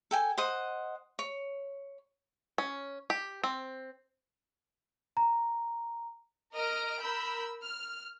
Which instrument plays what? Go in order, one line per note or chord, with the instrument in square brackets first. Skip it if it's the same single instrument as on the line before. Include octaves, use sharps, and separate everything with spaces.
[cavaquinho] A4 G5 G#5
C5 D#5 F#5 D#6
C#5
[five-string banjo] C#4
G4
C4
[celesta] A#5
[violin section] A#4 D#5 F6 A#6 D7
A#4 B5 E6 G6
F6